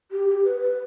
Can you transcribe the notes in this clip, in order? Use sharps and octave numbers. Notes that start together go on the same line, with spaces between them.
G4
G4
B4
B4